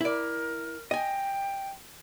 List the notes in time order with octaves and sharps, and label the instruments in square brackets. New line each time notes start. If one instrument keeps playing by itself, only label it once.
[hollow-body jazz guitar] E4 D5 [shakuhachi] A#4
[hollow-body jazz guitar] D#5 G#5 [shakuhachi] G5